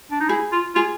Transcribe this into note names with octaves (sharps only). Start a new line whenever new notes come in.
D4
D#4
E4 G#4
F4
F4 G#4